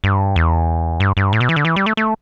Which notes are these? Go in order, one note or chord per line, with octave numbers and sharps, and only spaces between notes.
G2
E2
G2
G2
A2
B2
E3
D3
E3
G3
A3
A3